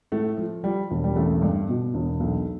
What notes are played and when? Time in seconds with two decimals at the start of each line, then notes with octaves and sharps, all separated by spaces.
0.12 A2 A3
0.37 F3
0.64 F3 G3
0.91 E1
1.04 G3
1.16 A1 A3
1.42 G2
1.69 B2
1.94 E1
2.20 B1